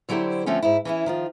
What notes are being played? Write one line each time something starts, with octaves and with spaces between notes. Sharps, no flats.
D3 F#3 E4 G4 C5 D5
D3 F3 A3 C4 C#4
G#2 E4
E3 C#4 E4
D#3 F3 F4